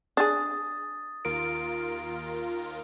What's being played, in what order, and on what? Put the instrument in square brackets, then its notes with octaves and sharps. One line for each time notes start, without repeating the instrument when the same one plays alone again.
[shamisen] D4 G#4 [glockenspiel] D#6 A6
[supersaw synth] D#2 F4 A#4 [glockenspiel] D7